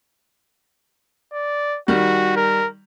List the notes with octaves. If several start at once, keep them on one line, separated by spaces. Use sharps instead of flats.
D5
D#3 G3 F#4
A#4